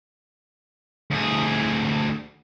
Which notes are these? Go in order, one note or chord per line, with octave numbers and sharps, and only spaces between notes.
D2 G#4